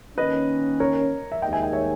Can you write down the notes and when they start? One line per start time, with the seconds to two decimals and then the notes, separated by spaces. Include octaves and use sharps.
0.18 D#3 A#3 C#4 B4 D#5
0.80 A#4 C#5
1.32 E5
1.42 D#2 D#3 G#3 D#4 D#5 G5
1.53 E5 G#5
1.63 D#5 G5
1.73 C#5 E5